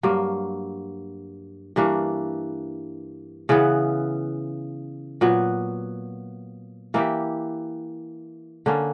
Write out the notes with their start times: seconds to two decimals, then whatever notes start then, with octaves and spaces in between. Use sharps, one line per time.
0.03 G2 F#3 A#3
1.76 G2 E3 A#3 D4
3.49 C#3 E3 B3
5.21 A#2 F#3 B3
6.94 E3 A#3 E4 G4
8.66 D3 A#3 C#4